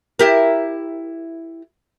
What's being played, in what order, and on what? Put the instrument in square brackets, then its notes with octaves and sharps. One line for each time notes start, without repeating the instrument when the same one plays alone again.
[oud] E4 G4 A#4